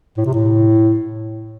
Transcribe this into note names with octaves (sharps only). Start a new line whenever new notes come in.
A2
C3
A2